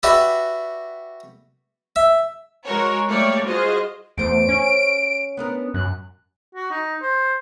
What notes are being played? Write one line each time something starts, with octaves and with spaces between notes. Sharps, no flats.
F#4 G4 B4 D5 E5
E5
G#3 F#4 A#4 C#5
G3 A3 A#3 G4 C#5 D5
F4 F#4 G#4 C5 D#5
E2 A3 C5 D7
C#4
B3 D4 A#4
F#2 F#6
F#4
D#4
C5